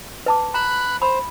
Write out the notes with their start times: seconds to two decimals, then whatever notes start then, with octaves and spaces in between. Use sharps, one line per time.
0.26 B4 A5 D6
0.54 A#5 B5 F#6
1.02 C5 B5